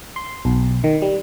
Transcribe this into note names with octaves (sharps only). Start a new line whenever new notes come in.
C6
B1
D#3
G3